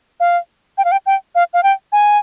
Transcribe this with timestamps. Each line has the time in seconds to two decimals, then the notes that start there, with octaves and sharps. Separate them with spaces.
0.20 F5
0.78 G5
0.85 F5
0.92 G5
1.06 G5
1.35 F5
1.54 F5
1.63 G5
1.92 G#5